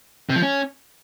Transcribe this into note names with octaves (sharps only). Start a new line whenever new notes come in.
C3
F3
C#4